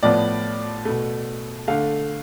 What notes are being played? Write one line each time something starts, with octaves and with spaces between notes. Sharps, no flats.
A2 F3 B3 D5
B2 A3
D3 A3 F5